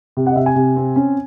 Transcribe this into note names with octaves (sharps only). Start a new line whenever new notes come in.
C3
F#5
D#5
C3 E5
G#5
C3
C4
C#4